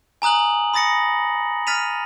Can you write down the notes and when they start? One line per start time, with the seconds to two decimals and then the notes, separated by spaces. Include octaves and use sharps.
0.22 G#5 A#5 D#6 F#6 F#7
0.74 B5 D#6 A6 A#6 C#7
1.67 F6 A6 B6 D#7 F7